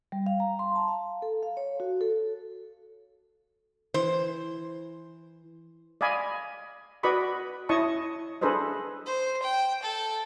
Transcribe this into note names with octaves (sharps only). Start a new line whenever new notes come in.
G3
F5
A#5
C6
A5
F5
A4
F5
C#5
F#4
A4
E3 C5
D5 D#5 F5 G#5 B5
F#4 B4 D5 D#5 B5 C#6
E4 C#5 D#5 A5 C#6 D#6
D4 G#4 A4 B4 C5 D#5
C5
G5
A4